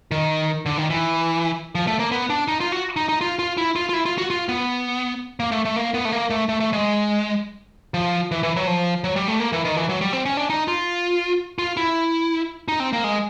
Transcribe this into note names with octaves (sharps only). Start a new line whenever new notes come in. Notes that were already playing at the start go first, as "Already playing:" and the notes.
D#3
D3
D#3
E3
F3
A3
A#3
B3
D4
D#4
F4
F#4
D#4
D#4
F4
F4
E4
F4
F4
E4
F4
F#4
F4
B3
A#3
A3
A3
A#3
B3
A3
A#3
A3
A3
A3
G#3
F3
E3
E3
F#3
F3
F#3
G3
A3
A#3
E3
D#3
E3
F#3
G3
C4
C#4
D4
D#4
F4
F4
E4
D#4
C4
A#3
G#3